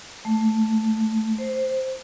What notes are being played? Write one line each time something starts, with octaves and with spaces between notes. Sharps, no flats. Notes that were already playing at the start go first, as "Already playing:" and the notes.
A3
C5